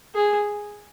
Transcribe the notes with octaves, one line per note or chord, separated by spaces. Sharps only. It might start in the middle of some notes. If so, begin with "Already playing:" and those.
G#4